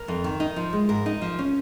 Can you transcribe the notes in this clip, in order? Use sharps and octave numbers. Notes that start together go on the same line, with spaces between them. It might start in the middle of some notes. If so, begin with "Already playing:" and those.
Already playing: A#4
F2
D#3
D#4
F3
G#3
G#2 A#4
D#4
F3
C#4